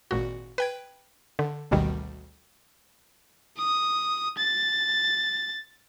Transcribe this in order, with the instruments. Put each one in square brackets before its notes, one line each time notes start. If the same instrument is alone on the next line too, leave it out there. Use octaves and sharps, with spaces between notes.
[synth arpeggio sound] G#1 A#2 F#4
B4 G5 G#6
D3
G#1 D2 B2 D#3 G3
[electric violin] D#6
A6